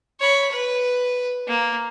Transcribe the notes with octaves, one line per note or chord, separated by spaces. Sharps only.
C#5 B5
B4
A#3